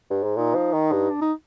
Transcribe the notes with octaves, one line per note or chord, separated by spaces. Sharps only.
G2
G#2
A#2 D#4
F3
D#3
G2
D4
D#4